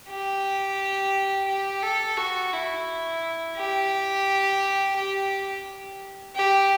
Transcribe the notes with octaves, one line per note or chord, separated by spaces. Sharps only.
G4
G4
A4
F#4
E4
G4
G4
G4